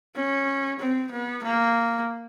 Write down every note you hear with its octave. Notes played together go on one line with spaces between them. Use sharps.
C#4
C4
B3
A#3